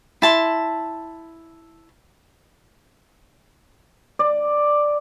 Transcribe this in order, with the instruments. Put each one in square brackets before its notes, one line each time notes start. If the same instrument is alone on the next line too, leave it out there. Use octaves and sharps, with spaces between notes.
[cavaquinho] E4 A5 C6
[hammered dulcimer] D5